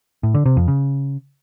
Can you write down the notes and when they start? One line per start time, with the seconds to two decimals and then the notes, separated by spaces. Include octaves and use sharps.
0.23 A2
0.34 D3
0.46 C3
0.57 F2
0.68 C#3